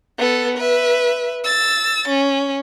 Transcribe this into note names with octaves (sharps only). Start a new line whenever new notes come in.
B3 A4
B4 E5
E6 A6
C#4